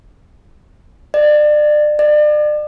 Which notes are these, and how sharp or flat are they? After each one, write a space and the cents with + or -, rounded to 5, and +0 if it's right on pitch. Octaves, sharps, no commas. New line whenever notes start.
D5 +30
D5 +35